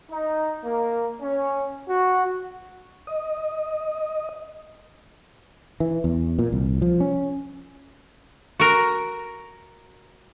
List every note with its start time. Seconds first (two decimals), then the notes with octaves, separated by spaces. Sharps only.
0.11 D#4
0.65 A#3
1.22 C#4
1.89 F#4
3.07 D#5
5.80 E3
6.04 E2
6.39 A#2
6.52 C2
6.82 F3
7.00 C#4
8.60 F#4 A#4